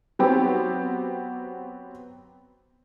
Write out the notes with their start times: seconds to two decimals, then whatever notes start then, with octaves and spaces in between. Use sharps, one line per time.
0.19 F#3 B3 C4 G4